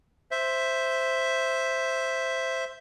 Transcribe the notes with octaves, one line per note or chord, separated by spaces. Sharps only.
C5 E5